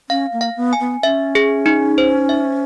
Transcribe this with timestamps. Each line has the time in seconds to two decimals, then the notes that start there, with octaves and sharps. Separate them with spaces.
0.09 C#4 F5
0.33 A#3
0.41 F5
0.56 B3
0.73 G#5
0.80 B3
1.03 C#4 E5
1.35 G#4
1.66 D#4
1.98 C5
2.29 E5